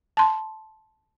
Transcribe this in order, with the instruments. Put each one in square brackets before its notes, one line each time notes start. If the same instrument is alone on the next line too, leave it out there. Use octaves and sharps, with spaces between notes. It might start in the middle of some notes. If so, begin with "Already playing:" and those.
[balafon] A5 C6